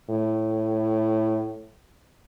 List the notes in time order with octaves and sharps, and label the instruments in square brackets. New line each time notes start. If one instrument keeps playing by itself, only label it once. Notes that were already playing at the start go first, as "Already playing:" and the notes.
[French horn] A2